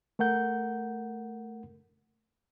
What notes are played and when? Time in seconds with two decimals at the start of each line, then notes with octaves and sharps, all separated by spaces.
0.19 A3 A#4 F#5 G6